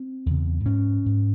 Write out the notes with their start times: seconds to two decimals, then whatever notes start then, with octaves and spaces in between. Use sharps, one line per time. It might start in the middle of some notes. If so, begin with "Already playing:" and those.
Already playing: C4
0.26 E2 C#3
0.65 G#2 C#4
1.06 G#2